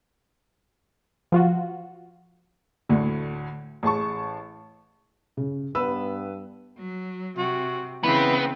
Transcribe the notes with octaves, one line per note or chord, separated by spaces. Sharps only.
F3 F4 F#4
D2 A2 D3
A1 G#4 A5 C#6
C#3
G2 B3 B4 E6
F#3
C3 F#4
C#3 E3 B3 C4